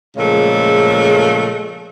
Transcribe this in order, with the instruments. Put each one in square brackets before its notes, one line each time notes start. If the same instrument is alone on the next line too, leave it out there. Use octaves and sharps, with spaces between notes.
[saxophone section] A#2 C#3 F3 G#3 A3